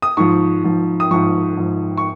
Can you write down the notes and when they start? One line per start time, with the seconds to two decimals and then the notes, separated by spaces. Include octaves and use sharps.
0.02 D#6
0.17 G#2 F3 C#6
0.64 G#2 F3
1.00 D#6
1.11 G#2 F3 C#6
1.57 G#2 F3
1.97 C#6